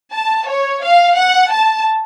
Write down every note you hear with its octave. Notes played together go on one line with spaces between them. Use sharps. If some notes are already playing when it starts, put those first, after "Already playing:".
A5
C#5
F5
F#5
A5